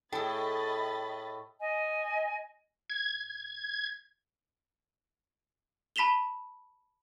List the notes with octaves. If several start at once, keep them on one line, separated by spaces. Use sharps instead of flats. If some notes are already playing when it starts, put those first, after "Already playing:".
A2 G#4 A4 D#5 G5 B5 A6
D#5 G#5
G#6
A5 B5 B6 E7 F7 G7